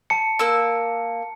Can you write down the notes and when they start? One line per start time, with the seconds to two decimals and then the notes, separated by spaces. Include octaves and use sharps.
0.10 A5 C#7
0.39 A#3 E6